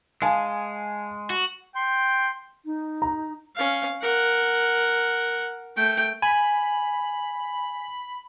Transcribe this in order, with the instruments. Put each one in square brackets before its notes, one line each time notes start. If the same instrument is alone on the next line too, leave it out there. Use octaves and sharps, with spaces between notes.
[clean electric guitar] G#3 [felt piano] F5 G#5 A5
[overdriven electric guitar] F#4
[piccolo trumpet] G5 [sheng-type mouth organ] C6
[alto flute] D#4
[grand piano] A#5
[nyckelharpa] C#4 F5
A#4 F#5
A3 G5
[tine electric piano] G#5 [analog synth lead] B5